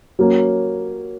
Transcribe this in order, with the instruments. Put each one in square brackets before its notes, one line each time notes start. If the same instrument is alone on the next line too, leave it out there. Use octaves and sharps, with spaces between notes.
[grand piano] F#3 A#3 C#4